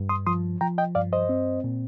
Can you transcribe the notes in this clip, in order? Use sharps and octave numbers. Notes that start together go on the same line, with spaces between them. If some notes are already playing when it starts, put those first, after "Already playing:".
Already playing: G2
C6 D#6
F3 C6 D#6
F3 G5 A#5
D#5 G5
G2 D5 F5
C5 D#5
C4
A#2